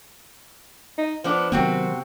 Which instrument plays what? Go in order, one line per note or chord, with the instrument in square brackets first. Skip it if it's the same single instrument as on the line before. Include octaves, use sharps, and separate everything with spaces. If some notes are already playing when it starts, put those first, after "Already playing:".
[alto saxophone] D#4
[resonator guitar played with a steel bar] F3 B3 D4 [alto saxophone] C5
[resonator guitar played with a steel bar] C3 C4 F#4 [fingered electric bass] D#3 F#3 B3